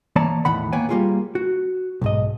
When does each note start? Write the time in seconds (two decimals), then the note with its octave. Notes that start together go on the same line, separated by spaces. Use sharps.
0.16 E3 A#3 C#5 D5 A5 A#5
0.45 E2 A2 D#3 F#5 B5
0.72 A#3 B3 B4 C#5 G5 G#5
0.89 G3 A#3 D4 F4 G4 G#4
1.35 F#4
2.02 B1 G#2 D#5